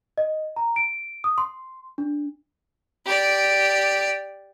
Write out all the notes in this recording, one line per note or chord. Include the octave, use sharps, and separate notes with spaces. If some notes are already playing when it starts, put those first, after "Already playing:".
D#5
A#5
D7
D#6
C6
D4
G4 D5